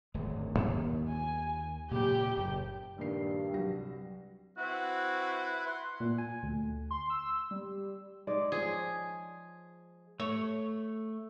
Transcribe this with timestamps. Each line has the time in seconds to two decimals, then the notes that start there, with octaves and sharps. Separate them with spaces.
0.14 D1 G#1 G#3
0.59 D#2
1.09 G#5
1.91 A#2 C#3 F#3 G4 G5
2.37 F#1
2.98 A#1 G2 D#3 C7
3.52 C2 F#3 G3 F#4 A#6
4.58 C4 E4 F#4 B4
5.67 F#5 C6
6.00 A#2
6.18 G#5
6.43 D2
6.91 C6
7.10 E6
7.51 G3
8.27 G#3 D#4 D5
8.52 F3 G#4 C#5
10.20 A3 C#5